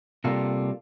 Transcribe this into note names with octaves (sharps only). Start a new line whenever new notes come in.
C3 G3 A#3 F4 A4